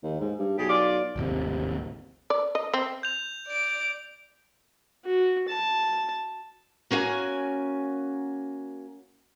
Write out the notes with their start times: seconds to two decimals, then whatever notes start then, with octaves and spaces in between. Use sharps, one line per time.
0.03 D#2
0.20 G#2
0.39 G2
0.58 B1 G4 G#4
0.70 F4 D5
1.16 D1 G#1 D#2 C3
2.30 D5
2.55 D#5
2.74 C4
3.03 G6 F7
3.47 D5 D7
5.05 F#4
5.49 A5
6.91 A#3 C#4 E4 F#4 G#5